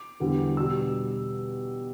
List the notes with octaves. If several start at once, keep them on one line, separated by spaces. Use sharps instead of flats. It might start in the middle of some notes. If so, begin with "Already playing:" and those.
Already playing: D6
E2 D3 G3
B2 G3 E6